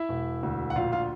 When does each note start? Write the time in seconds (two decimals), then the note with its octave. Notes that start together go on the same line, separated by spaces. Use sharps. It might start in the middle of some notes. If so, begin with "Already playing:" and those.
Already playing: E4 E5
0.09 E1
0.43 D2
0.70 F#5
0.75 A#1 F4 F5
0.92 F4 F5